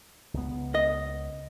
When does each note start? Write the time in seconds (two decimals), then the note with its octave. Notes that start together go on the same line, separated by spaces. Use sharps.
0.34 C#2 B3
0.75 D#5